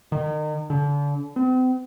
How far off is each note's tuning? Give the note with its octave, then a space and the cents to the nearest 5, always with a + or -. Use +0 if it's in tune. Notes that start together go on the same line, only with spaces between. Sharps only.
D#3 -35
D3 -35
C4 -40